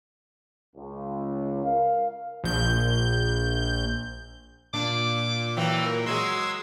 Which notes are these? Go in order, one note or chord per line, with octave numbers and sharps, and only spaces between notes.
C#2
A#4 F5
A#1 G6
A#2 D4 D6
E3 F#3 G5
A#4
F#3 G#3 F#4 C6 E6 G#6